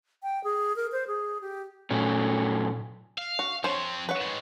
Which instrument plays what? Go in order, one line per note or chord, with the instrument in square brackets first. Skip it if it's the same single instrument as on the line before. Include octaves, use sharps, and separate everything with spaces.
[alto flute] G5
G#4
A#4
C5
G#4
G4
[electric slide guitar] F#2 A3 C#4 [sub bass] A#2
[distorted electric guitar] F5
[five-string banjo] F#4
[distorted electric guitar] F3 C4 [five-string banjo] C5 C#5
[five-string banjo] B4 C#5 F#5
[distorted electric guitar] D#3 G#3